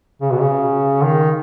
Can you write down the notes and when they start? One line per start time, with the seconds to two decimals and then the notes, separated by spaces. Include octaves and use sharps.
0.22 C#3
0.31 B2
0.40 C#3
1.02 D#3